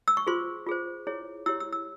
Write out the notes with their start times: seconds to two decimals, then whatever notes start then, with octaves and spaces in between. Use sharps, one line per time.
0.08 E6
0.17 C#6
0.27 F4 G#4 C5 C6
0.67 F4 G#4 C5
1.07 E4 G#4 C#5
1.46 E4 G4 C#5 E6
1.60 E6
1.72 E6